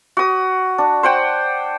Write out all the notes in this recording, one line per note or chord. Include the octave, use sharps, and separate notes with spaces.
F#4 D#6
D4
C5 F#5 G5